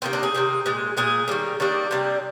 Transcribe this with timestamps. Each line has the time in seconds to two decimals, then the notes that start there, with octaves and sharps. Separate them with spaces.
0.02 C3 D#3 A#3 C4
0.13 D4
0.23 G#4
0.34 C3 D#3 A#3
0.66 A#2 G#3
0.97 A#2 G#3 G#4
1.28 D#3 G3 A#3
1.60 D#3 G3 A#3 D4
1.91 C3 G3 A#3